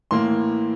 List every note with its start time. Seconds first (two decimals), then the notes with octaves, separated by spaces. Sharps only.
0.11 A2 E3 A#3 C6